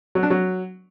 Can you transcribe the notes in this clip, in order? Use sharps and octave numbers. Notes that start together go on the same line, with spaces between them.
F#3
D4
F#3